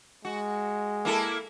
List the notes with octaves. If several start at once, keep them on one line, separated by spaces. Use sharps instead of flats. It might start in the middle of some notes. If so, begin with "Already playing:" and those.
G#3 F#4
A#3 E4 A4